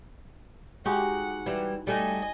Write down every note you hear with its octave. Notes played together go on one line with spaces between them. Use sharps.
G#3 D#4 F#4 G4 F#5
E3 G3
G3 A3 D#5 G#5